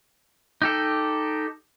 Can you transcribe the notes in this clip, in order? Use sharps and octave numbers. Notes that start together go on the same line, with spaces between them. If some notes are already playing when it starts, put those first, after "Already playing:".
D#4 G4 A4